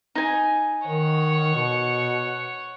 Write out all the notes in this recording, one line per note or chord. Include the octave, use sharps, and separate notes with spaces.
D#4 G#5
D#3 C#5 F#5
B2